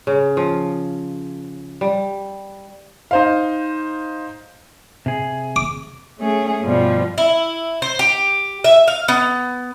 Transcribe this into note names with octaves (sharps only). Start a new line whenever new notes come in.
C#3
F3
G3
D#4 C5 F5
C3 G#4
D6
A3 C#4 G#4
G2 B2 F3 G3
E4
C5
G4
E5
F5
B3